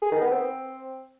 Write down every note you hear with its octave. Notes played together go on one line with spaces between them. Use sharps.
G#4
D#3
B3
C4